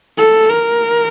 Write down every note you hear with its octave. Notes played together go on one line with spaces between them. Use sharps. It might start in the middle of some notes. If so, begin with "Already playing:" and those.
A4
A#4